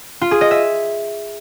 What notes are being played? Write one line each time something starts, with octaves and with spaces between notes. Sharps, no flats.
F4
G#4
D#5
E5